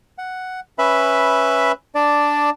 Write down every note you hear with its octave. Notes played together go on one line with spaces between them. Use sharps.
F#5
C#4 B4 E5 B5
D4 D5